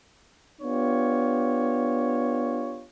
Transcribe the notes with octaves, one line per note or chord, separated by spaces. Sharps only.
B3 D4 F4 G4 C#5